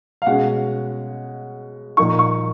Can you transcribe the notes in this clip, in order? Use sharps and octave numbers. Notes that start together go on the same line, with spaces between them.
F5
B2 G#3 C#4 F#5
A#2 F3 A#3 D#4 C#6
C#6